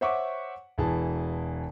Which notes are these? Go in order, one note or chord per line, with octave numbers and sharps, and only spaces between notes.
C5 C#5 E5 F#5 C#6 D6
E1 E3 G#4 A5